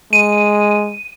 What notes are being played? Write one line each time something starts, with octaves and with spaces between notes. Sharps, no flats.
G#3 D#7